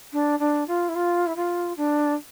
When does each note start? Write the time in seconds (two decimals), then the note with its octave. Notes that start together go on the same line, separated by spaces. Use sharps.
0.13 D4
0.39 D4
0.68 F4
0.89 E4
0.95 F4
1.26 E4
1.36 F4
1.77 D4